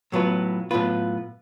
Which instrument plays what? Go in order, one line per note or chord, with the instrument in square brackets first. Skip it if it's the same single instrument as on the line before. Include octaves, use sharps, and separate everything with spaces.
[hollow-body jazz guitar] A2 F#3 B3 F4 B4
A2 F#3 B3 F4 B4